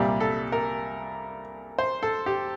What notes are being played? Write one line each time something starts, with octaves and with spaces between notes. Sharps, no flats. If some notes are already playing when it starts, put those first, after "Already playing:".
Already playing: C2 A#2 G3 A#3 G4
A4
A#4
C5
A4
G4